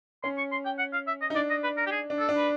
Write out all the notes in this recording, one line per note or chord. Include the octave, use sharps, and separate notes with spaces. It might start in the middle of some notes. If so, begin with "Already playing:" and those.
C#4 C6
C#6
C6
G5
F#5
F5
E5
D#5
D#4
D4 D5
D#5
B4
A#4
G4
G#4
D4
A4
D4
B4